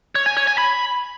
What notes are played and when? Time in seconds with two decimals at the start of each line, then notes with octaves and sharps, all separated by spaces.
0.15 C#5
0.26 G#5
0.37 C#5
0.47 G#5
0.58 B5